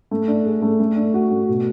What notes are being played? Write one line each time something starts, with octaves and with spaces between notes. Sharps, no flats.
A3
D4
G#4
A3
A3
D4
F#4
A3
B2